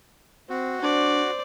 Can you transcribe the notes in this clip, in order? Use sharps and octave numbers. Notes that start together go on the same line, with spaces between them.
C4 F#4
D4 C5 D5